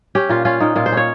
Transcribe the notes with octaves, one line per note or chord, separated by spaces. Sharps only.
C#4 G4
A#2 F4
C#4 F4
A#2 D#4
A#2 F4
C5
C#4 C#5